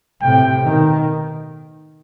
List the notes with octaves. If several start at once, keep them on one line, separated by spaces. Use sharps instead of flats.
A2 C3 G5
B2 D#3